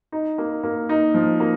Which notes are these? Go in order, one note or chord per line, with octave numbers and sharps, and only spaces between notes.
D#4
A#3
A#3
D#4
F3
A#3